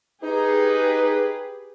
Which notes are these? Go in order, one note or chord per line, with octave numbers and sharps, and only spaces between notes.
D#4 G4 G#4 B4